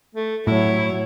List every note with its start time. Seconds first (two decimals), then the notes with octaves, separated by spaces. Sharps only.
0.15 A3
0.47 A2 F#3 E4 C#5